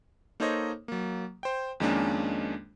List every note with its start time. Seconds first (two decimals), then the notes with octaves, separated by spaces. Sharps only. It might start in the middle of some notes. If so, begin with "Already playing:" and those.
0.40 A#3 D#4 A4 C5 C#5 D#5
0.88 F#3 A#3
1.43 C5 G5
1.80 F2 D#3 G#3 A#3 C#4 D4